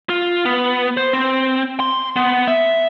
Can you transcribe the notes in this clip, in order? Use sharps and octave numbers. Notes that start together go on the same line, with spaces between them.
F4
B3
C5
C4
C6
B3
E5